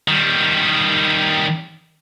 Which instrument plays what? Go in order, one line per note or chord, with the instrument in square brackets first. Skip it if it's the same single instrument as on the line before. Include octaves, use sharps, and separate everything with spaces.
[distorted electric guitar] D#3 G3